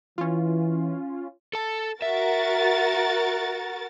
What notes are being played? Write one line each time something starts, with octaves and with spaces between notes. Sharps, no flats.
E3 C#4 F4
A4 A5
F#4 A#4 E5 A6